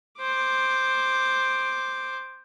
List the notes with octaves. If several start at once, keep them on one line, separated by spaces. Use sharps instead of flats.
C5 D6